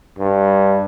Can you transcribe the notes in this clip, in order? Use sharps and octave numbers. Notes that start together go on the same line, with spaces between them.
G2